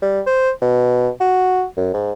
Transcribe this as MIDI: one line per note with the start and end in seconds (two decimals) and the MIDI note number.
0.02 0.21 55
0.26 0.51 72
0.61 1.09 47
1.21 1.65 66
1.77 1.90 42
1.94 2.13 44